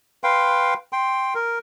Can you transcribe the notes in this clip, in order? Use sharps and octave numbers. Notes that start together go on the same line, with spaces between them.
B4 F5 G5 C6
G5 C6
A#4